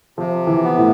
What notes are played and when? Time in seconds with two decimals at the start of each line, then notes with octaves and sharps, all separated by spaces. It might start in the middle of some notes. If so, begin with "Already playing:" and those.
0.18 C3 F3
0.47 E3
0.63 B3
0.77 A2